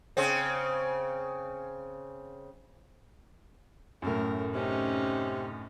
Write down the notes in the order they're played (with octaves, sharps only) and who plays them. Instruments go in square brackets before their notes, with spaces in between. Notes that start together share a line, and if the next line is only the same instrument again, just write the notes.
[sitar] C#3 C4
[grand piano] F#2 A2 [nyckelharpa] A3 A#4
[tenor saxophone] C3 [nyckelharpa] C#4 D#4